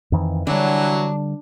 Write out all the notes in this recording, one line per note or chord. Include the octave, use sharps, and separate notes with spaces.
F2 D#3 E3
D3 E3 F#3 G3 D4